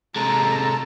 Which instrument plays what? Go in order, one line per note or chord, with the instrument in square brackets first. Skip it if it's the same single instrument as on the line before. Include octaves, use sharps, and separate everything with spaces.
[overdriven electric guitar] C3 G#3 [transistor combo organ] A4 [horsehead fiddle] A#5